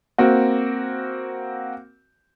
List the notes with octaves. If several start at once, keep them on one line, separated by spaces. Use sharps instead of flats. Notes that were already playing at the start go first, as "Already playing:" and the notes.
A#3 C4 F#4